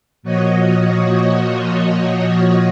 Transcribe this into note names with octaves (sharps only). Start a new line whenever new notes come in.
A#2 F3 F#4 C#5 D#5